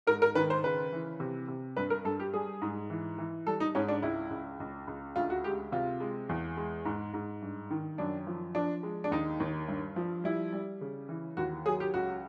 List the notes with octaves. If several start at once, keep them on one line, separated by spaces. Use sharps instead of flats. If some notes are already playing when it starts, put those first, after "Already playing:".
G#2 A#4
A#4
D#3 B4
C5
C#3 B4
E3
C3
C3
G2 B4
A#4
G2 A4
G4
G3 G#4
G#2
E3
E3
G3 A4
D#4
G#2 C#4
D4
C#2 E4
C#2
C#2
C#2
D2 F4
F#4
G#3 G4
C3 F4
G#3
E2
G#3
G#2
G#2
G2
D#3
F#2 D4
F3
F3 D4
G#3
D4
D#2 D#4
D#2
G2
F3
G3 E4
G3
C#3
E3
D#2 F#4
F#3 G#4
G4
C#2 F#4